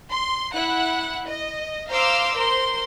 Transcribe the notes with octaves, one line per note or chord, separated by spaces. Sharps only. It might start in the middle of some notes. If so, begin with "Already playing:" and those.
C6
E4 F#5 F#6
D#5
C5 F5 A#5 C6 D6 E6
A#4 C5 C6